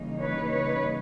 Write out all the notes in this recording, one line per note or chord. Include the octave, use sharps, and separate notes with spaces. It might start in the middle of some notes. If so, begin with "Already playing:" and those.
Already playing: C#3 E3 G3 A#3 D#4
B4 C#5
B4 C#5